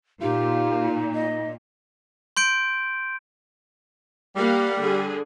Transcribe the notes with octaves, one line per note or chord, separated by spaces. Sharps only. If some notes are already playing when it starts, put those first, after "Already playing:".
A#2 D#4 F4 G4
D#5
C6 G6 D7
G3 A#3 F5 F#5
D3 G#4